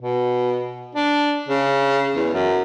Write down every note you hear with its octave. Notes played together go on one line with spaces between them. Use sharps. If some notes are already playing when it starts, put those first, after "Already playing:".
B2
D4
C#3
E2
F#2